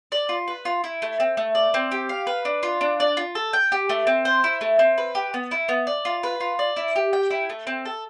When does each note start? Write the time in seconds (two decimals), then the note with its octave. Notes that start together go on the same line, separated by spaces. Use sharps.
0.12 D5
0.29 F4
0.48 B4
0.65 F4
0.84 E4
1.02 A3
1.20 C4
1.37 A3
1.55 D5
1.74 C4
1.92 G4
2.09 F5
2.27 B4
2.45 D4
2.63 F4
2.81 D4
3.00 D5
3.17 F4
3.35 A4
3.53 G5
3.72 G4
3.89 A3
4.07 C4
4.25 C5
4.44 E4
4.61 A3
4.79 C4
4.98 B4
5.15 G4
5.34 B3
5.51 E4
5.69 B3
5.87 D5
6.05 F4
6.23 B4
6.41 F4
6.59 D5
6.76 E4
6.96 G4
7.13 G5
7.31 E4
7.50 A3
7.67 C4
7.85 A4